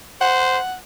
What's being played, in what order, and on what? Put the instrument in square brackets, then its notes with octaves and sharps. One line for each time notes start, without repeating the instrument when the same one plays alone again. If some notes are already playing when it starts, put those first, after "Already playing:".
[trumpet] C5 [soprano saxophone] F#5